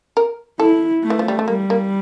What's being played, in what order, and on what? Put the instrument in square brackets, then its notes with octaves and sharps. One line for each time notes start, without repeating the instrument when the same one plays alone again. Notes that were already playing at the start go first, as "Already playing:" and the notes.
[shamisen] A#4
[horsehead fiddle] E4 [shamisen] A4
[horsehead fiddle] A3
[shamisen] E3
F3
G3
A3
[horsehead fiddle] G3 [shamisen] A#3
[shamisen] A#3